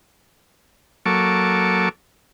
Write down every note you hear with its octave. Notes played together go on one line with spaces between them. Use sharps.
F#3 A#3 A4 C#6 D6